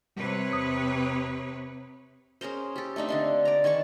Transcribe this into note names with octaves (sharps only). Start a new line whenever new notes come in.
C3 G3 B4 C#5
E2 D#6
C#4 G#4 A#4 C5
G4 A4
A3 C4 D4 D#4
D3 D4 C6
D5 A#5
D#3 G#5 A5 C#6